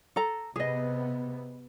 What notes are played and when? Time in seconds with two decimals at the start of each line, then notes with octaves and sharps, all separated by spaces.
0.16 A4 A#5
0.56 C3 B3 G#4 D#5